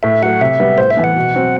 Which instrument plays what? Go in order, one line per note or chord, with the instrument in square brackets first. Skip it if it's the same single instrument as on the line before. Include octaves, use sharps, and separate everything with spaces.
[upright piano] A2 [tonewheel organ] E5
[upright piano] F#3 A3 [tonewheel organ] F#5
[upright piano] C3 [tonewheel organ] E5
[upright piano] G3 B3
[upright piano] A2 [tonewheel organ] C5
[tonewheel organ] E5
[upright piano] E3 B3
[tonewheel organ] F#5
[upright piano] B2
F#3 C4